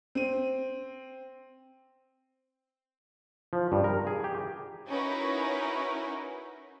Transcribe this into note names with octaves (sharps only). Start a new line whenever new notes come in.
C4 D#7
F3
G2
A#4
G#4
G4
C#4 D#4 E4 F#4 A#4 B4